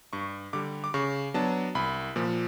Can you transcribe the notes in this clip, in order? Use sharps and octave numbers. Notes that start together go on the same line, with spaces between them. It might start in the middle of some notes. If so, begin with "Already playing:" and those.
G2 C#6
D3 G3 D6
D6
C#3 C#6
F#3 B3 D4 A5
C2 B5
A#2 F3